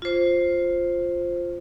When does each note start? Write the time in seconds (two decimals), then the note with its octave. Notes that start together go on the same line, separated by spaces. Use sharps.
0.02 F4 C5